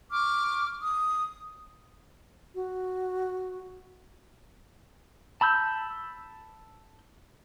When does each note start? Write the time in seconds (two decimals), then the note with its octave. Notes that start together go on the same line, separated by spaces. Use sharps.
0.10 C#6 D6 F6
0.81 D#6
2.55 F#4
5.41 A5 B5 E6 G6